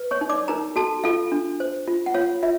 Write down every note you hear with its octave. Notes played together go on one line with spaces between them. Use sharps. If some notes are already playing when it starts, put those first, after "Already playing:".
Already playing: B4
C#5 C#6
D#4
D5 D6
D#4 A#4 A#5
F#4 A4 A5
F4 A4 F5
D4
C5
F4
F#5
F4 C#5 F5
F4 E5